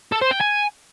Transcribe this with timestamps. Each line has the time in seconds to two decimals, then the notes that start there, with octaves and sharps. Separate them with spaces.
0.12 A4
0.21 C5
0.31 G5
0.40 G#5